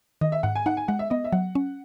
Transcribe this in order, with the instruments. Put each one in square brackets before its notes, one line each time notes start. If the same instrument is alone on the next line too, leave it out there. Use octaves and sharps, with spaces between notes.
[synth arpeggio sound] D#3 [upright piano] D#5
[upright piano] E5
[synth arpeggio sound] G#2 [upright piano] F#5
[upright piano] G#5
[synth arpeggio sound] D#4 [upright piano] F#5
[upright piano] G#5
[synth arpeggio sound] G#3 [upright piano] F#5
[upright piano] E5
[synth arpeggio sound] B3 [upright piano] D#5
[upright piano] E5
[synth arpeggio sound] F#3 [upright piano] F#5
[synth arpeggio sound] C#4